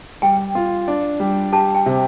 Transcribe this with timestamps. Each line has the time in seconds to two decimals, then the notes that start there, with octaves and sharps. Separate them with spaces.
0.22 G3 G5
0.55 F4
0.88 D4
1.20 G3
1.52 G4 A5
1.75 G5
1.86 C3